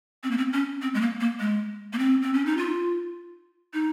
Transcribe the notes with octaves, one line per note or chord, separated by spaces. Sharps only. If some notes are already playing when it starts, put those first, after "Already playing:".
C4
A#3
C4
C#4
C4
G#3
A#3
A#3
G#3
A#3
C4
C4
C#4
D#4
F4
D#4